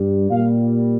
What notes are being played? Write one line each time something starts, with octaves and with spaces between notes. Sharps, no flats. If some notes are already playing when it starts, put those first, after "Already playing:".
Already playing: G2 G3
A#2 G3 F5